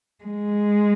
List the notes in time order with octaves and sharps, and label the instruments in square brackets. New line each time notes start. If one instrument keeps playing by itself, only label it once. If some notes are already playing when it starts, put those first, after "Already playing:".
[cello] G#3